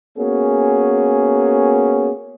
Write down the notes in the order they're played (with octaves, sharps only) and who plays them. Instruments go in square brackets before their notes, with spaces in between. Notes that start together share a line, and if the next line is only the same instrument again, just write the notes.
[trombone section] A#3 B3 C#4 F#4 G#4